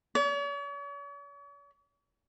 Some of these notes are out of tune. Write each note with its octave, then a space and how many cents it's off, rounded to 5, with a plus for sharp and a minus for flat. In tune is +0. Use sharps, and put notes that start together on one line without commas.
C#5 +45